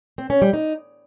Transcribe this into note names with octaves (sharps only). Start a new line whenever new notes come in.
C4
C#4
G3
D#4